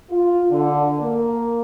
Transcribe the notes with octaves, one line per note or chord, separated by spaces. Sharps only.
F4
D3
A#3